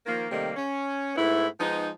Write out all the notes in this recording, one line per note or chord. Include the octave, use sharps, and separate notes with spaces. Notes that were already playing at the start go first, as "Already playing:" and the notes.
D#3 F3 A#3
C3 D#3 G3 A3 A#3
C#4
G#2 A3 B3 E4
F3 G#3 B3 D#4